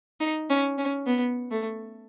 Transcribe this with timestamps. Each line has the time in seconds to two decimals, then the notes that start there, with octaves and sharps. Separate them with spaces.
0.20 D#4
0.50 C#4
0.78 C#4
1.07 B3
1.51 A3